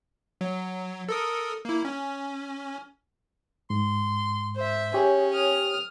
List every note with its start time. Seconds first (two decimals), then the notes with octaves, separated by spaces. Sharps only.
0.41 F#3
1.09 A4 A#4 D#6
1.65 A#3 E4
1.85 C#4
3.70 G#2 C6
4.55 C5 E5
4.94 C#4 G4 G#4 C#5 G5
5.33 D#6 F6